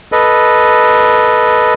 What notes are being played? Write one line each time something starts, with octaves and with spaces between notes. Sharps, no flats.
A4 B4 D#5